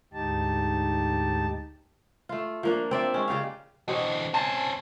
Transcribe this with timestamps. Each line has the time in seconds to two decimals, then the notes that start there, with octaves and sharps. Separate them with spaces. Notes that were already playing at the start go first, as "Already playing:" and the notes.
0.13 D2 G#2 D#4 G4 A5
2.29 A3 F4
2.63 F3 A#3 D4
2.91 C4 D5 E5
3.14 G#3 C#4
3.28 C#3 G4 D5 F5
3.88 B2 D3 E3 C4 C#5
4.34 C#4 C5 G#5 A5